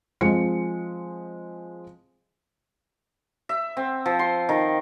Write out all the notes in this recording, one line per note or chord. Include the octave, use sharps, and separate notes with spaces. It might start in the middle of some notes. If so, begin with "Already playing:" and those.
F3 G#3 C4 C#7
E5
C4
F3
C6
D#3